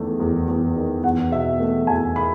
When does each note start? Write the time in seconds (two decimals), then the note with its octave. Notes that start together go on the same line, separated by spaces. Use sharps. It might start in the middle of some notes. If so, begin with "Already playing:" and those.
Already playing: E2 D#3 A3
0.20 E2
0.48 E2
0.76 D#3
1.03 E2 F#5
1.31 B2 E5
1.60 A3
1.87 E2 G#5
2.16 B5